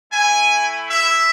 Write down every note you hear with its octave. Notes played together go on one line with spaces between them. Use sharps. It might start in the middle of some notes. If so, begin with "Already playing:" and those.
A3 E4 G#5
E5